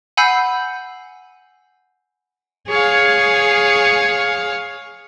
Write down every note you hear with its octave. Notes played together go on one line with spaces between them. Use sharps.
F#5 G#5 B5 E6 G6 C7
G#4 C#5 F5